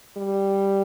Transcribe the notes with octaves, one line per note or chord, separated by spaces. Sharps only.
G3